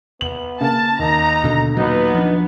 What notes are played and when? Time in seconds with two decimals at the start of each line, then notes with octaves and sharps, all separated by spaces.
0.21 B3 F#7
0.61 C#3 A#3 A5
0.99 D#2 D#4 A#5
1.44 B2 D3
1.77 A#2 F#3 B3 D#4
2.15 F3 D4